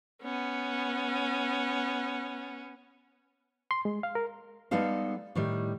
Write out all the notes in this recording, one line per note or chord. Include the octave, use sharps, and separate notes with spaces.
B3 C#4
C6
G#3
F5
A#4
G3 G#3 B3 D#4 A4 F5
A2 D#3 G3